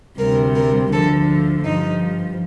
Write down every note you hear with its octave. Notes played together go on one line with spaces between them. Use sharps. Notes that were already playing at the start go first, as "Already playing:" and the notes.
D2 C3 G3 A#4
A#4
D2 D3 F3 A4
G2 F3 D#4